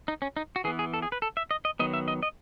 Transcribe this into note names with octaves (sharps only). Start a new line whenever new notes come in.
D#4
C#4
D#4
F#4
E3 B3 G#4
G#4
A4
G#4
B4
A4
E5
D#5
D#5
D#3 F#3 B3 D#5
E5
D#5
D#5